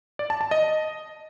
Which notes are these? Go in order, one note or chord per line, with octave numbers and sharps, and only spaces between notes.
D5
A5
A5
D#5